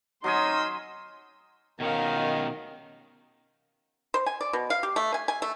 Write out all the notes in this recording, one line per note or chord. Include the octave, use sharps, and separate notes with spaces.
F#3 C#4 D#4 G#5 C6 D#6 E6
B2 D#3 C#4 A#4 F5
C5
G#5
D5
B2
F5
G4
A3
G#5
G#5
A3